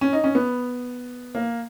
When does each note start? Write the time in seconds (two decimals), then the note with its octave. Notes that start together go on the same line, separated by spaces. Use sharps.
0.01 C#4
0.13 D#4
0.24 C#4
0.35 B3
1.35 A#3